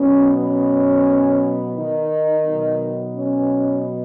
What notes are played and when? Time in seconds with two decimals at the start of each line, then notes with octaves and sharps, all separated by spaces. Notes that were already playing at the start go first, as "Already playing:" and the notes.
Already playing: B2 F#3 B3 C#4
0.36 C#4
1.75 D#3 D#4
2.45 B2 F#3 B3
3.15 C#4